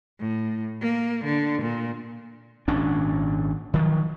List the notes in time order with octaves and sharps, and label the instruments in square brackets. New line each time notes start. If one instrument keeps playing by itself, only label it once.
[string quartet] A2
A#3
D3
A#2
[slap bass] G#1 A#2 C#4 D4
D#3 F3 F#3